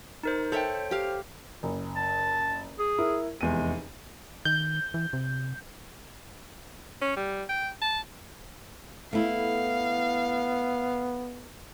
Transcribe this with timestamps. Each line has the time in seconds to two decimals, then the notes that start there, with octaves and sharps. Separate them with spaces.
0.23 D#4 A#4 C5
0.52 A4 C5 C#5 E5 G5
0.91 G4 F5
1.63 F#1
1.96 A5
2.79 G#4
2.98 E4 A#4
3.41 F1 E2 G#3 D#7
4.45 D#3 G6
4.94 E3
5.13 C3
7.01 C#4
7.16 G3
7.49 G5
7.82 A5
9.13 A3 B3 E4 F5